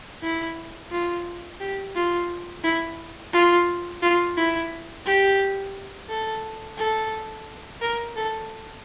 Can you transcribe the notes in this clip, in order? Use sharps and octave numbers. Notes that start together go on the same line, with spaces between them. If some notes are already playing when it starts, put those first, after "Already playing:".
E4
F4
G4
F4
E4
F4
F4
E4
G4
A4
A4
A#4
A4